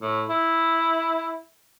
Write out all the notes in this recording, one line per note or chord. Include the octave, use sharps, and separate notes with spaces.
A2
E4